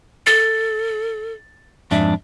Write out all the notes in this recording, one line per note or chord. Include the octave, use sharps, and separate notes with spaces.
A4 A6
F2 G#2 D4 E5